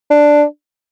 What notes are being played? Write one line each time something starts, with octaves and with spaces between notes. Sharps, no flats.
D4